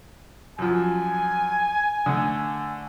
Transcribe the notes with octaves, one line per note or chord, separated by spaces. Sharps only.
F#2 F3 G#5
D3 A3